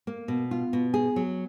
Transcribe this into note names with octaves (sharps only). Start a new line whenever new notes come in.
A#3
B2
F4
B2
G#4
F#3